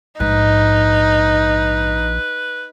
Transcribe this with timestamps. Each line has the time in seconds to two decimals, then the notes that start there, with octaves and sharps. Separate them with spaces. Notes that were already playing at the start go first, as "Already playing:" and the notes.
0.20 A#1 G#2 D#4 B4